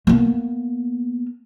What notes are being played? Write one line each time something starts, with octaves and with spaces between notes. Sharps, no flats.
A#3 B3